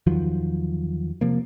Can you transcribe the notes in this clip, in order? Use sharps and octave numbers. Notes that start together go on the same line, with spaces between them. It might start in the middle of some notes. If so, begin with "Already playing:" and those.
E2 D#3 F3 F#3
C3 F3 A#3